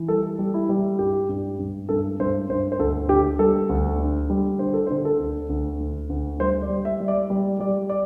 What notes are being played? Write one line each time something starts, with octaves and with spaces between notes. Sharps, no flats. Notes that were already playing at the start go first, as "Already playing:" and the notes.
Already playing: E3
G3 A4
G3
E4
G3
G2 G4
G2
G2
G2 A4
G2 C5
G2 C5
C5
D2 A4
D3 G4
G3 A4
D2
D3
G3
D3 C5
A4
C5
D3
A4
D2
D2
D3
D2
G3 C5
D5
G3
E5
G3
D5
G3
G3 D5
D5